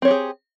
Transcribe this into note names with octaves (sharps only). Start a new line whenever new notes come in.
C4 G4 G#4 C#5